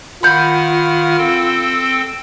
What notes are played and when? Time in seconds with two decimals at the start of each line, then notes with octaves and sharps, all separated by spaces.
0.23 D#3 F4 F#5 B5 F6 G6
1.18 C4 A4 G5